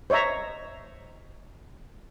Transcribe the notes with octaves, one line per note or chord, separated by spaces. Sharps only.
C5 C#5 D#5 E5 A#5